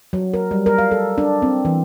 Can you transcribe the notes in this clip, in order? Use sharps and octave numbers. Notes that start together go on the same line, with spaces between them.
F#3
A#4
G3
A#4
F5
A4
D4
C4
E3